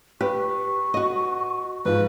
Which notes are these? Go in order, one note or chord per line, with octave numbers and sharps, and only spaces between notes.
G4 B4 C#6
F#4 D#5
G#2 F3 B4